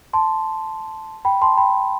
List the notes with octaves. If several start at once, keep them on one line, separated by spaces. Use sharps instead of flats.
A5 C6
G5 B5
A5 C6
G5 B5